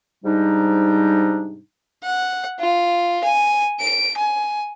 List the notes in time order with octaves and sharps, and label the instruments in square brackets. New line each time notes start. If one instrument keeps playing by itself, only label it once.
[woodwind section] G#2 C3 G3 D4 D#4
[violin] F#5
F4
G#5
D7
G#5